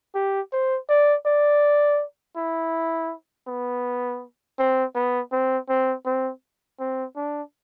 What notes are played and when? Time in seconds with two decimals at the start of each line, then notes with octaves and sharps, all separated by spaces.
0.15 G4
0.52 C5
0.89 D5
1.26 D5
2.36 E4
3.47 B3
4.59 C4
4.95 B3
5.32 C4
5.69 C4
6.06 C4
6.79 C4
7.16 D4